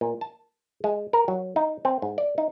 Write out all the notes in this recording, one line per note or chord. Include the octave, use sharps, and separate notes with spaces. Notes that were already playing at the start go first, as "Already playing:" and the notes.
A#2
A5
G#3
A#4
F#3
D#4
C4
G#2
D5
D#4